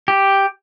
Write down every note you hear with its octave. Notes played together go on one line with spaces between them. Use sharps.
G4